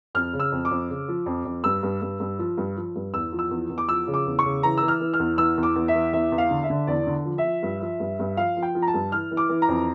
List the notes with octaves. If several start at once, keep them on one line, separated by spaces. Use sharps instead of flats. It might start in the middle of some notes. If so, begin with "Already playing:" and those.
F2 F6
C#3
E6
F2
D6
F2
C#3
F3
F2
F2
G2 E6
G2
G2
G2
F3
G2
F3
G2
E2 E6
F3
E6
E2
E2
D6
F3 E6
C#3
D6
E2
C#6
C#3
E3 A#5
E6
E3
F6
E3
F6
E2
E3 E6
E2
D6
E2
E5
E3
E2 E5
E2
F5
D3
E5
D3
E2 D5
D3
F3
E5
F3
G2
F3
G2
G2
F3 F5
F3
G5
F3
A#5
A5
G2
E3 F6
E3
D6
E3
A#5
F2